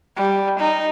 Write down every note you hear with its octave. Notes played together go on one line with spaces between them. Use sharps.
G3
D#4